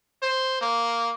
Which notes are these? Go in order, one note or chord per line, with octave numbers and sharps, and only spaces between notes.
C5
A#3